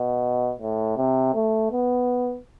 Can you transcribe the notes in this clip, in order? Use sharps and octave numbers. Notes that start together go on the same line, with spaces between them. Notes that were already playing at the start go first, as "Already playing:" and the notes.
Already playing: B2
A2
C3
A3
B3